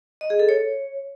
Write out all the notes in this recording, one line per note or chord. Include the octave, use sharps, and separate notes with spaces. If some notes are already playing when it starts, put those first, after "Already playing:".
D#5
G#4
A4
C#5